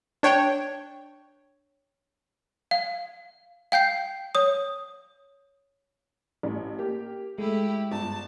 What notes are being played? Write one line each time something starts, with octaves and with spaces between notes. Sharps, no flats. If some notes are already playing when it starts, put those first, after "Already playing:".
D4 C#5 G5
F5
F5 G5 G6 C7
C#5 D#6
A1
A#3 G4
G#3 A3 E4 G4
G1 A5